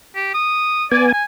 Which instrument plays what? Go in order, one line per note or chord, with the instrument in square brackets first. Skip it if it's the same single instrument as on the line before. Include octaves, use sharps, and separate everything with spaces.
[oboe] G4
D#6
[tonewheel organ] B3 G#5 [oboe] D5
[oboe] G#5